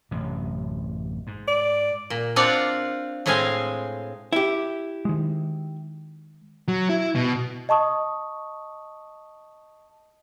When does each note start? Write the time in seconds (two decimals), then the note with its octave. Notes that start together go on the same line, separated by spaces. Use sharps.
0.11 A1 F#2 C3
1.27 G#2
1.48 D5
2.10 A#2
2.36 C4 D4 F4 D5 F5 F#5
3.26 A2 G#3 C4 G#4 F5 G#5
4.33 E4 G4
5.05 D#3 G#3
6.68 F#3
6.89 E4
7.15 B2
7.69 D#5 A5 C#6 D#6